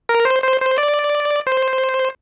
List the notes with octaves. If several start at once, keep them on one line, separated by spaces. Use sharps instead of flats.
A#4
C5
C5
C5
D5
C5